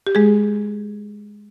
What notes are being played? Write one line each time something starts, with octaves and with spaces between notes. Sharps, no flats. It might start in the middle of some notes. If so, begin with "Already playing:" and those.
G4
G#3 G#4